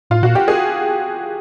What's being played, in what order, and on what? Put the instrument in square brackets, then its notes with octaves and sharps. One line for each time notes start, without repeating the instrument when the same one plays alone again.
[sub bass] A2 [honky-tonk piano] F4
[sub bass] A#2 [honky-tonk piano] F#4
[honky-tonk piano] G4
G#4